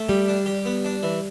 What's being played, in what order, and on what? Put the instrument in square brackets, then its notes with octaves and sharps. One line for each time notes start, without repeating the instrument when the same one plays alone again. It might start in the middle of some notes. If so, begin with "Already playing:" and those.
Already playing: [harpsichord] A3
[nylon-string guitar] G3 [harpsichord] G4
[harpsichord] D4
G4
B3
D4
E3